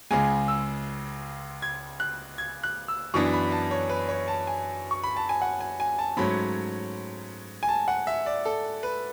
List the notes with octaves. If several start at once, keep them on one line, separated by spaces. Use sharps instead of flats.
C#2 C#3 G#3 G#5
E6
G#6
F#6
G#6
F#6
E6
F#2 E3 B3 D4 C#6
B5
A5
C#5
B4
C#5
A5
G#5
C#6
B5
A5
G#5
F#5
G#5
G#5
A5
G#2 F#3 A3 C#4 B5
G#5
A5
F#5
E5
D5
A4
B4